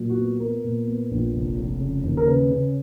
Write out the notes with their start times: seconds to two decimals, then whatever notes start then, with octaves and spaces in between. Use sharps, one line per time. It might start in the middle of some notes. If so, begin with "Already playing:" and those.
Already playing: A#2 F#3
0.10 F#4
0.17 B3
0.40 B3 A#4
0.64 A#2
0.87 B3
1.11 A#1
1.34 F1
1.57 F1
1.80 C#3
2.04 D#2
2.17 A#4
2.27 C#3 B4
2.51 C#3